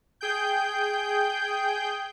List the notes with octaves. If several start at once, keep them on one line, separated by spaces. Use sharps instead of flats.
G#4 G5 G6